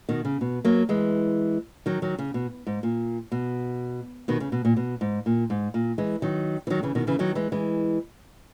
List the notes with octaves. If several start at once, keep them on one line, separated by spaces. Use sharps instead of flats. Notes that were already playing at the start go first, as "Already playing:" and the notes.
B2 D#3
C#3
B2
F#3 A#3
E3 G#3
D#3 F#3
D#3 F#3
C#3
B2
G#2
A#2
B2
B2 D#3
C#3
B2
A#2
B2
G#2
A#2
G#2
A#2
E3 G#3
D#3 F#3
E3
D#3 F#3
C#3 E3
B2 D#3
C#3 E3
D#3 F#3
E3 G#3
E3 G#3